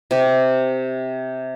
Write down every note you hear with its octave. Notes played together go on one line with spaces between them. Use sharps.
C3 G4